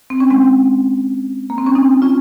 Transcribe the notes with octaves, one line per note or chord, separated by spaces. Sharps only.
C4
C#4
G#3 C4
A#3
C4
C#4
C4 D#4
C#4 F4